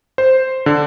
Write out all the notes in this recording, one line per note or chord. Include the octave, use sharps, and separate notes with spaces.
C5
D3